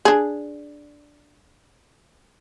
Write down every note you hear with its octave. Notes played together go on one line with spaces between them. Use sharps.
D4 G#4